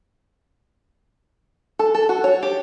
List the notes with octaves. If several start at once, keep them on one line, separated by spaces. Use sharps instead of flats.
A4
A4
F#4
C#5
G4